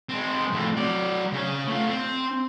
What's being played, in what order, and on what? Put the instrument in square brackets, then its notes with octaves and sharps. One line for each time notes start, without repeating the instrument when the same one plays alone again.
[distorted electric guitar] G#3 C4
F2 A2
F#3 D5
C#3 C#5
A3 F4
C4